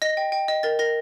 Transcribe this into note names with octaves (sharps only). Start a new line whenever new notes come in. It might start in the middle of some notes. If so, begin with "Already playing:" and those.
D#5 A#6
G5
G5
D#5
A#4 A6
A#4 A#6